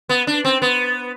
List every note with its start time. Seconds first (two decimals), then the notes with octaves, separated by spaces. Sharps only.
0.09 B3
0.27 D4
0.45 C4
0.62 B3